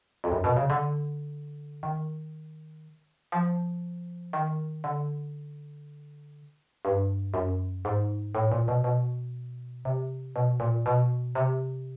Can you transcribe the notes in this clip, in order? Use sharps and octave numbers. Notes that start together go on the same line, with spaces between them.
F2
F#2
B2
C#3
D3
D#3
F3
D#3
D3
G2
F#2
G#2
A2
A#2
B2
B2
C3
B2
A#2
B2
C3